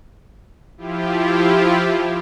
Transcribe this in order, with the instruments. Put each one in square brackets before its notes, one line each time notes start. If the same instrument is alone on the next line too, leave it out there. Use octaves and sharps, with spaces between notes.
[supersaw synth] F3 E4 F4 G4